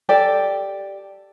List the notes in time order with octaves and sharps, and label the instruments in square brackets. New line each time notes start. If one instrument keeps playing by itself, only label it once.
[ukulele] G4 A4 D5